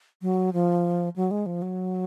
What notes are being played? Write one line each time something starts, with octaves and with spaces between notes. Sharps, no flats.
F#3
F3
F#3
G#3
F3
F#3